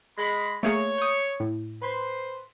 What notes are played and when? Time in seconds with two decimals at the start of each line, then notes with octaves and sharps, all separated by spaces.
0.18 G#3 B5
0.63 A3 A#3 G#4 C#5
0.98 D#6 G6
1.40 A2
1.82 B4 C5